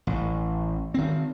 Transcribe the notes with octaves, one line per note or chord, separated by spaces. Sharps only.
A1
D#3 C4